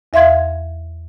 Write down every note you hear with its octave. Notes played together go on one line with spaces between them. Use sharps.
E2 E5 F5 C6 G#6